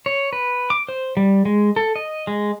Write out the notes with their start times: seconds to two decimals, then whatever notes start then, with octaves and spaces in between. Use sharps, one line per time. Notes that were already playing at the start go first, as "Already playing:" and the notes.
0.06 C#5
0.33 B4
0.70 D6
0.89 C5
1.17 G3
1.45 G#3
1.76 A4
1.96 D#5
2.27 G#3